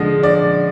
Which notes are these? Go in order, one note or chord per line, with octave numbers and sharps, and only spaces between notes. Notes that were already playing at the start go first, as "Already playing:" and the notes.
Already playing: D3 F3 G#3 D#5
D5